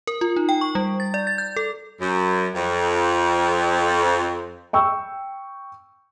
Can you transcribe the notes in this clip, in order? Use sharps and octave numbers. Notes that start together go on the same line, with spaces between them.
A#4
F4
D#4
G5
C#6
G3
A6
D5
A6
G6
A4
F#2
F2
G5 C#6 E6